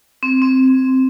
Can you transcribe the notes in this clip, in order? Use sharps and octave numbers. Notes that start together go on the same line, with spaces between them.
C4
C4